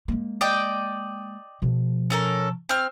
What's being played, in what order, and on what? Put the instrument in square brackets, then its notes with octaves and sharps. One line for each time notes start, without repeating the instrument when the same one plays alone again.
[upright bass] G#3 A#3
[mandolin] D5 D#5 G5
[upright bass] B2 F3
[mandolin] C#4 A4 A#4
C4 F6